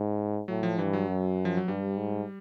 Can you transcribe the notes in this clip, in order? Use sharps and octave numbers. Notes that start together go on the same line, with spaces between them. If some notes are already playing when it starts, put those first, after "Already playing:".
Already playing: G#2
A2 F#3
F3
G2 E3
F#3
F#2
F3
F#3
G2 G3
G#2